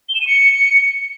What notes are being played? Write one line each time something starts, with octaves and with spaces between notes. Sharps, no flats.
G7
E7
D#7
C#7